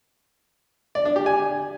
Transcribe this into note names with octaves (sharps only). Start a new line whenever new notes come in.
D5
D4
G4
G#5